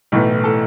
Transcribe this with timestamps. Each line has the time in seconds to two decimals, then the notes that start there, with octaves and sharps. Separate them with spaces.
0.12 B1 A2 E3 A3
0.44 A4 A5